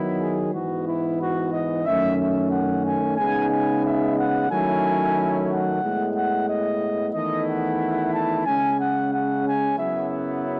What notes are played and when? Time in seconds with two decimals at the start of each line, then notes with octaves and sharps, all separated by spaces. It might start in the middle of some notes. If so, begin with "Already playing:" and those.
Already playing: D#3 F#3 B3 E4
0.20 G#4
0.53 G#2 E3 B3 F#4
0.86 E4
1.20 F#4
1.52 D#5
1.86 F#2 D#3 A3 C#4 E5
2.18 E5
2.51 F#5
2.84 G#5
3.17 C#3 G#3 B3 D#4 G#5
3.51 G#5
3.84 E5
4.17 F#5
4.49 D#3 F#3 A3 C#4 E4 G#5
5.49 F#5
5.82 A2 G#3 B3
6.15 F#5
6.48 D#5
7.13 E2 D#3 A3 E4 D#5
7.47 F#5
8.13 A5
8.46 C#3 G#3 C#4 G#5
8.79 F#5
9.13 F#5
9.45 G#5
9.78 F#2 C#3 F#3 B3 E4 E5